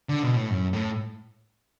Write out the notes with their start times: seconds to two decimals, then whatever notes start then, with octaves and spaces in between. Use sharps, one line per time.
0.09 D3
0.23 B2
0.36 A2
0.50 F#2
0.73 A2